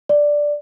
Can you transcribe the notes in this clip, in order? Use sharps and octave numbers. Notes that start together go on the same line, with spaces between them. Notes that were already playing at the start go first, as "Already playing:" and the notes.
D5